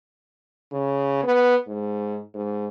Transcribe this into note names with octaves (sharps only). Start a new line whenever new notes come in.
C#3
B3
G#2
G#2